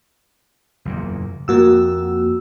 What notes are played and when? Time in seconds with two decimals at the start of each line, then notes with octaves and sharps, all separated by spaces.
0.85 F#1 E2 A#2
1.48 F2 A#3 F#4 E6